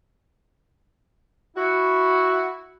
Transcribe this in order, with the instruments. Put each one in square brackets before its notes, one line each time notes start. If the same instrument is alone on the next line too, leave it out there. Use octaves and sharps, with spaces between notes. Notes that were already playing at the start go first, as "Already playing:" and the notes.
[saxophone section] E4 F#4